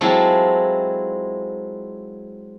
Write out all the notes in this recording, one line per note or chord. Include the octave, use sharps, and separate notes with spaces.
F#3 G#3 C4 E4 F4 A4